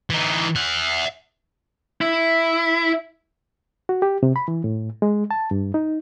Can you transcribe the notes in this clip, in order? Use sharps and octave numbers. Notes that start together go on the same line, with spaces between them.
E3 D#4
E5 F#5
E4
F#4
G4
C3
B5
E3
A2
G#3
A5
G2
D#4